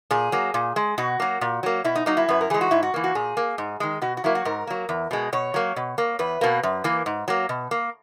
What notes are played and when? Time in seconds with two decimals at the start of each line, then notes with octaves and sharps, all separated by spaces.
0.11 A#2 G#4
0.32 F#3 A#3
0.54 A#2
0.76 G#3
0.98 B2 F#4
1.20 F#3 A#3
1.41 A#2
1.63 F#3 A#3
1.84 B2 E4
1.96 D#4
2.06 F#3 A#3 D#4
2.17 E4
2.29 F#2 B4
2.41 A#4
2.50 E3 G#3 G#4
2.61 F#4
2.71 G#2 E4
2.83 F#4
2.94 E3 A#3
3.04 F#4
3.15 A#2 G#4
3.37 A#3
3.58 G#2
3.80 D#3 G#3
4.02 B2 F#4
4.17 F#4
4.24 F#3 A#3 E4
4.35 F#4
4.45 G#2 A#4
4.67 F#3 A#3
4.89 E2
5.11 B2 G#3
5.33 B2 C#5
5.54 F#3 A#3
5.76 B2
5.98 A#3
6.19 E2 B4
6.41 B2 A#3
6.63 F#2
6.84 E3 A#3
7.06 G#2
7.28 F#3 A#3
7.49 B2
7.71 A#3